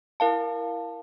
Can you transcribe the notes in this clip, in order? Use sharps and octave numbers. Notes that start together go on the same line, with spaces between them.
E4 A#4 F5 A5